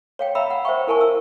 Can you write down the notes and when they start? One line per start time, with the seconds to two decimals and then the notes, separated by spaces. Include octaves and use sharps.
0.19 C#5 F5 G5
0.35 E5 F5 A#5 B5 E6
0.51 F#5
0.65 C5 E5 F5 G5 C#6
0.87 E4 A#4 G#5 A5 C#6
1.01 E6